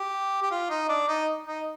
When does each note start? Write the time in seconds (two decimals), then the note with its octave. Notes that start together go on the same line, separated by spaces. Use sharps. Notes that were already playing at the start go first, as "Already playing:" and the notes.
Already playing: G4
0.42 G4
0.51 F4
0.70 D#4
0.89 D4
1.08 D#4
1.46 D#4